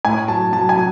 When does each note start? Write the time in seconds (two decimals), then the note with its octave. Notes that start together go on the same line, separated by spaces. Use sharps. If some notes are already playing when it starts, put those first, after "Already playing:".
0.05 A2 G#5
0.28 F#3 A5
0.53 F#3 A5
0.69 G#5
0.76 F#3